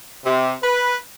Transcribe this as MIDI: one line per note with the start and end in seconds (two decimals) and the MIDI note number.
0.25 0.54 48
0.63 0.96 71